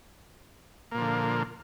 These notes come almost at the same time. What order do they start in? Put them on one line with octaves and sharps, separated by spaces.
A#3 A#2 F3 D3